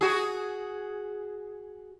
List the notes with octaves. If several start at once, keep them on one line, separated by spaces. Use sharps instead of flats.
F#4 G#4